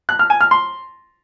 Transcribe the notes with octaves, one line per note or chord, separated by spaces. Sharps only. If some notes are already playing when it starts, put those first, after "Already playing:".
F#6
F6
G#5
F6
C6